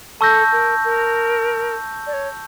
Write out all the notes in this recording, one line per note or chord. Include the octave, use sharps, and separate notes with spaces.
A4 A5 C#6 E6 G6 A#6
A#4
A#4
D5
C#5